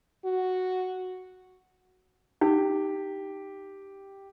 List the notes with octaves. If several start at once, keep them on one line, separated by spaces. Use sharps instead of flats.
F#4
D#4 G4